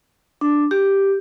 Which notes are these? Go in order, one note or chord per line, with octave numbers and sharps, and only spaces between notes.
D4
G4